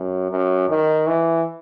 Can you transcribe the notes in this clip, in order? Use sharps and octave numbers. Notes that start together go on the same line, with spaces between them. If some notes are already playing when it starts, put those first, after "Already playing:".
Already playing: F#2
F#2
D#3
E3